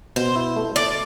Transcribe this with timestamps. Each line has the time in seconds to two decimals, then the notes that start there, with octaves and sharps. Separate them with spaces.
0.16 B2 C5
0.36 E4
0.56 A3
0.75 A3 D5